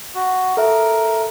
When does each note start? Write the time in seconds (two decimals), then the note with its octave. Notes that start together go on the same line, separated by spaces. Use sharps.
0.15 F#4
0.57 A4 A#4 E5